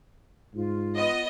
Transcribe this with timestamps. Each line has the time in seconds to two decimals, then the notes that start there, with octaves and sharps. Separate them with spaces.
0.55 G#2 F4
0.96 B3 D#5